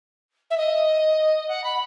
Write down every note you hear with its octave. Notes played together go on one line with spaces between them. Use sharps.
E5
D#5
F#5
B5